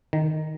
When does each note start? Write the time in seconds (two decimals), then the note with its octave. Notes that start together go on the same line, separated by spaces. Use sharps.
0.13 D#3